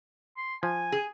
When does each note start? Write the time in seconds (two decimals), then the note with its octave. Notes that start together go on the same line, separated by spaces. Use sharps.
0.37 C6
0.63 F3 G#5
0.92 G#4